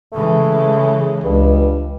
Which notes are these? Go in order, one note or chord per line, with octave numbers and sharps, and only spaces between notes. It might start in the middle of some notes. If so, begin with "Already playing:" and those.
C#3 E3 G#3 A3
C#2 G2